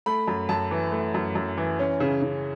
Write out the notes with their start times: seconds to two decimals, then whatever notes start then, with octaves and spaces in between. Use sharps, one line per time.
0.06 A3 B5
0.28 F#2
0.49 F#2 A5
0.71 E3
0.92 A3
1.14 F#2
1.35 F#2
1.57 E3
1.79 C#4
2.00 C#3
2.22 C#3